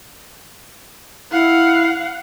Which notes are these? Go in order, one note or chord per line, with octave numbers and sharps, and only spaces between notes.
E4 F5 F#5